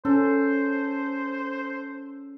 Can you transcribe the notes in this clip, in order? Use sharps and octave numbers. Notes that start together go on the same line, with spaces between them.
C#4 A4 C5